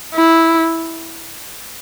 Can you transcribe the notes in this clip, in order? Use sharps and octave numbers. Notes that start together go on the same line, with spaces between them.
E4